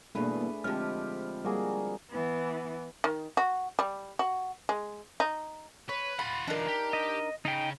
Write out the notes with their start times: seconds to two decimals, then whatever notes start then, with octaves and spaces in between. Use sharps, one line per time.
0.15 E2 G2 B2 A3 A#3 D4 G#4 B4
0.64 D3 F3 G#3 C4 G4 F6
1.45 G3 A#3 F#4 G#4
2.11 E3 B3
3.04 D#3
3.37 F#4
3.79 G3
4.19 F#4
4.69 G#3
5.20 D#4
5.89 B4 C#5
6.19 F4 F#5 B5
6.47 E3 D4 D#4 F4 A#4
6.68 G4
6.93 D#5
7.45 C#3 D#4 G5